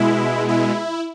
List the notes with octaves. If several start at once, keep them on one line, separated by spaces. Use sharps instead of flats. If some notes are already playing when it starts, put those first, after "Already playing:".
Already playing: B2 G#3 E4
E4